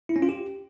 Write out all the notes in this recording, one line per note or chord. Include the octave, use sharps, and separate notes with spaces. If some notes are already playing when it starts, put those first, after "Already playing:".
E4
C#4
F4
G4